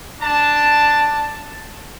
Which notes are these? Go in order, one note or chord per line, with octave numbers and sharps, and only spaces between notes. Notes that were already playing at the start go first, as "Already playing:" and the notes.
D4 A5